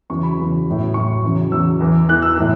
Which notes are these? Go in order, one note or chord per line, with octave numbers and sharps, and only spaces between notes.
E2 C#3 F#3 C#6
B5
E2 C#3 F#3
A2 F#3
A2 F#3 C#6
E2 C#3 F#3
E2 C#3 F#3 E6
E2 E3
E2 E3 F#6
E6
A2 E3